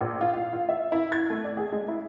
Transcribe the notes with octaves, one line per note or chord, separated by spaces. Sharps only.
A#1
F4
F5
F4
E5
E4
G#6
A3
D5
G#4
G#3
E4